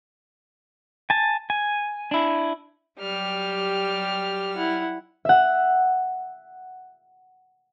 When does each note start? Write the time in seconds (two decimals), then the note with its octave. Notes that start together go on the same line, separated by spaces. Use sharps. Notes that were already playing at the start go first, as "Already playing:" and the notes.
1.10 G#5 A5
1.50 G#5
2.11 D4 E4
2.99 F#3 G3 G4 F6
4.56 E4 F#5
5.25 E5 F#5